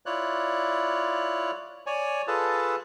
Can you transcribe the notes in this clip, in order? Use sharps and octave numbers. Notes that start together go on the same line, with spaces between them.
E4 F4 C#5 D5 F#6
C#5 D5 G#5
F4 G#4 A4 B4 A5